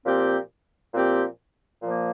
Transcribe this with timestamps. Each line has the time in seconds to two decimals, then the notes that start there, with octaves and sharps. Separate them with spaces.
0.06 A#2 F3 C4 G4
0.94 A#2 F3 C4 G4
1.83 A#2 F3 A#3